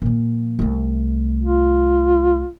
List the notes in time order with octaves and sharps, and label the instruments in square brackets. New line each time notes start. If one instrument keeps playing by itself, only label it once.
[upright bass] A#2 F3
C2 A3
[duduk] F4